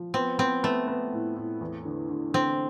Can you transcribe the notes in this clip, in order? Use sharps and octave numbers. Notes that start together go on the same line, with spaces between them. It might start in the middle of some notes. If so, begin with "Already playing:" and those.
Already playing: F3
B3 C4
B3 C4
A3 B3
B3
A2
A2
E2
D3
D3
D3 C4